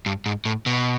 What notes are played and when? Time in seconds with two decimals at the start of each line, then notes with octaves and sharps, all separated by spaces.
0.06 G2
0.26 G#2
0.45 A2
0.66 B2